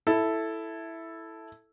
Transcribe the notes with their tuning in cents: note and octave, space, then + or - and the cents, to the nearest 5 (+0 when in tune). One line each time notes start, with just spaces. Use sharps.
E4 +0 A4 +0